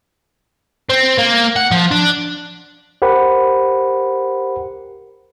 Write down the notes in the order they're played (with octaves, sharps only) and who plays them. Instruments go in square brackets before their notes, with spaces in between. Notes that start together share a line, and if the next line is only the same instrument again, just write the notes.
[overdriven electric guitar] C4
A#3
F#5
F3
D4
[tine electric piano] G4 A#4 C5 F#5 B5